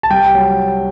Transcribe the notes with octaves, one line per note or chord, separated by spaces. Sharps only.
A5
C2 G5
F#3